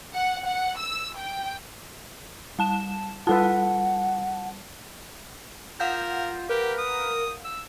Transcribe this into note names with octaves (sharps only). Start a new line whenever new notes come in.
F#5
F#5
E6
G5
G3 A5 E7
G3 F4 A4 B4 F#5 A5
F4 A#4 F5 F#5 G6
G4 A#4 B4
D#6
E6